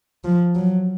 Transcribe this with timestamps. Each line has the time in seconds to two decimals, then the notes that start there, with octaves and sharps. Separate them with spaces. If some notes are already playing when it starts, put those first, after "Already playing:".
0.24 F3
0.55 F#3